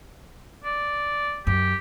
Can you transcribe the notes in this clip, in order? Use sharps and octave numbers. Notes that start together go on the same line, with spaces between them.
D5
F#2 G4